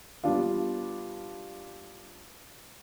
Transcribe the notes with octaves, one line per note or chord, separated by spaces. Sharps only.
G3 B3 D4 F4